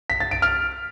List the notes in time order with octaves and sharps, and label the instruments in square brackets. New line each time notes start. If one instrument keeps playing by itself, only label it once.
[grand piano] B6
A6
D7
F6